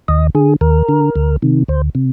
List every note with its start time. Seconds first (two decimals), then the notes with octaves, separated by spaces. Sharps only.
0.08 D#2 D#5
0.35 D3 G#4
0.61 D#2 A#4
0.89 D3
1.16 D2
1.42 C3 D#3
1.68 D2 C5
1.95 C3